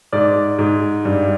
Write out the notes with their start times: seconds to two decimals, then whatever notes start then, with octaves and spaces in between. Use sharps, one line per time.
0.13 G#2 D5
0.59 G#2
1.05 G2